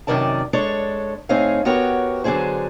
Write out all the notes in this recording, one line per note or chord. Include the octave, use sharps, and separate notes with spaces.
F#2 C3 D#3 A#4 D5 A5
G#3 D4 A4 C#5
A2 C4 D#4 G#4 C#5 F5
B3 F#4 G4 A#4 C#5
D3 F#3 D4 G#4 C5